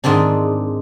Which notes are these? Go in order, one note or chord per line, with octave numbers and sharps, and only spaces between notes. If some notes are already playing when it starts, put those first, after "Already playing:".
G#2 D#3 C4 D4